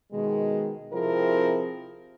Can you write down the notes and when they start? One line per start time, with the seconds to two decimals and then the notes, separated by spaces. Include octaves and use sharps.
0.13 B2 D#3 G#3
0.92 C3 F3 C4 E4 G#4 A#4